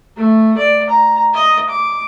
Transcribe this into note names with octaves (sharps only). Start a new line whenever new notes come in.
A3
D5
A#5
D#5
D6